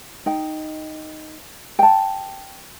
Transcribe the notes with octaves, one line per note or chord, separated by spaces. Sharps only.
D#4 G5
G5 A5